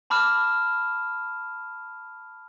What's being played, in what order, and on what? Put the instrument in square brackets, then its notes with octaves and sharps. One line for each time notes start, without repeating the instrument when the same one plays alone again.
[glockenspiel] A5 B5 D6 F6 E7